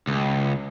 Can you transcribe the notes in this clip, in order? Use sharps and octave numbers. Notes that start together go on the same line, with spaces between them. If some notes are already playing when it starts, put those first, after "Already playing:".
C#2